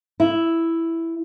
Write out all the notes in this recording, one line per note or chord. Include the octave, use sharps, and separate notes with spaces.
E4